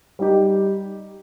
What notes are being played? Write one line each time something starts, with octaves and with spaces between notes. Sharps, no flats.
G3 D#4 G4